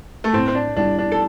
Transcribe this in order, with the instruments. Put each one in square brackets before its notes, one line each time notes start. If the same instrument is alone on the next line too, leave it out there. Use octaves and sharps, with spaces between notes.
[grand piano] A3
[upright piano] A2 [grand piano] C4
[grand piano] C4
D4
[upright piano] G3 E4 [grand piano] D4
[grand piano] D4
A4